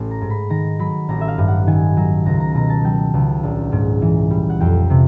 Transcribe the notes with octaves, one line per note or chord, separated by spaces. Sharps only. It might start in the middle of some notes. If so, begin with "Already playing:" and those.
Already playing: A1
A#5
G#2
B5
D#3 A#5
F#3 B5
A1 A#5
E5
F5
G2
F#5
D#3 G#5
F#3
C#2 A#5
A#5
B2 A#5
A5
F#3 G5
C#2
A#1
G#2
E3
G3
F#5
F2 G5
C3